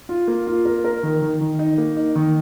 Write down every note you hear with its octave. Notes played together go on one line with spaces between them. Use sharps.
F4
A#3
F4
A#4
A#4
D#3
D#3
D#3
D#4
A#3
D#4
D#3